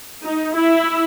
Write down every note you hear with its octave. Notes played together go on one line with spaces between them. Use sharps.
D#4
E4